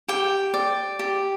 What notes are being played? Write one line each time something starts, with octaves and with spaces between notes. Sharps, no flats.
G4 G5
D5
G4